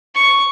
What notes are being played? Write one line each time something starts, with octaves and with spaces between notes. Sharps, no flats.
C#6